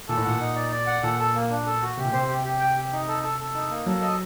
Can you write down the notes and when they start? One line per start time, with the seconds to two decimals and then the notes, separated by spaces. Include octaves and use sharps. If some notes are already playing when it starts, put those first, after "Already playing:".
0.08 A#2 A4
0.17 A2
0.24 A#2 F#5
0.40 D#4
0.55 D5
0.71 D5
0.87 F#5
1.03 A#2 A4
1.19 A4
1.35 A#3
1.50 D4
1.66 A4
1.82 F#4
1.97 C3 G4
2.05 A#2
2.12 C3 C5
2.29 G4
2.44 G4
2.60 G5
2.76 G4
2.92 D#4
3.08 A4
3.23 A4
3.40 A4
3.55 D#4
3.70 A#3
3.86 F#3 A4
4.02 D#5